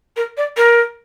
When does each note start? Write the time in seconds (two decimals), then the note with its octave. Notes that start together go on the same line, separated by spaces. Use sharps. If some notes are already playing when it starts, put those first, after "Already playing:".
0.17 A#4
0.37 D5
0.57 A#4